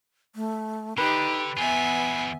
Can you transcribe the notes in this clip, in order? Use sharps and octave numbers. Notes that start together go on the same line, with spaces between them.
A3
D3 D#4 G4 B4
E2 B3 F4 E5 G#5